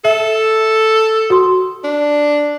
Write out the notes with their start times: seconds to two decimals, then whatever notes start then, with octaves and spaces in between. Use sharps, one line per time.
0.05 A4 E5
1.30 F#4 C6
1.84 D4